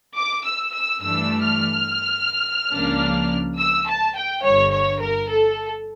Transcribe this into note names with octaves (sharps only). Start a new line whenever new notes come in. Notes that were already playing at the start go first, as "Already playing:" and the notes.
D6
E6
E6
G2 E3 A3 D4 E6
F6
C#2 C#3 F3 A#3 D4
E6
A5
G5
G1 G2 D3 C#5
C#5
A#4
A4